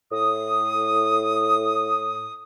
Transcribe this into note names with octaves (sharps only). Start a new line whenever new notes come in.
A2 D#6